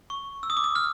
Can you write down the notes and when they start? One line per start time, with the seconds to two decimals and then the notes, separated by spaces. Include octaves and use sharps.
0.10 C#6
0.43 E6
0.50 D#6
0.57 D6
0.64 D#6
0.76 F6